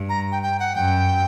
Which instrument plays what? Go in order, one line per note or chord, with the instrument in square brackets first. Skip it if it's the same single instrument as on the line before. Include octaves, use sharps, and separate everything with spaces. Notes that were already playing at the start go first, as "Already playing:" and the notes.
Already playing: [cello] G2
[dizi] A#5
G5
G5
F#5
[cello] F#2 [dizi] G5